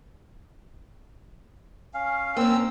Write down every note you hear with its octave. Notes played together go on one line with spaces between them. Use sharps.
C#4 F5
A#3 C4 C#4 E6